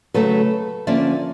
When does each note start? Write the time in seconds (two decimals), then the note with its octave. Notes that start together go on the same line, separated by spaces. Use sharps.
0.14 C#3 F#3 A3 A4 B4
0.87 D3 F3 A#3 C#4 D5 E5